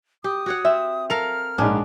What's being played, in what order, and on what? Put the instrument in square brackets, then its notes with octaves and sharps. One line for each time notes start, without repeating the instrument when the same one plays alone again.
[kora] G4 [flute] D#6
[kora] F#4 C#5 F#5
[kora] C4 [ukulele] E5
[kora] A4 A#4 F5 [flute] F6 [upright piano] F7
[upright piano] A#1 G#2 [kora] C#4 D4